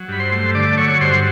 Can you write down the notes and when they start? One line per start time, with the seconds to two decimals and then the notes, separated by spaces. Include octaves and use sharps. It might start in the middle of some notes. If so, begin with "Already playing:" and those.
Already playing: F#3
0.08 G2 B5
0.19 C5 C6
0.32 A3
0.54 D3 D5 D6
0.77 F#3 C#5 C#6
1.01 G2 C5 C6